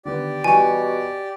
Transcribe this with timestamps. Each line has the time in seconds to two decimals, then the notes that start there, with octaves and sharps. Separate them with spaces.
0.05 D3 D#3 B3 G4 D5
0.44 B2 E3 G3 G#5 C#6